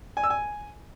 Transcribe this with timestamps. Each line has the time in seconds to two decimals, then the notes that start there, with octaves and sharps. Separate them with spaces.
0.17 G#5
0.24 E6
0.30 G#5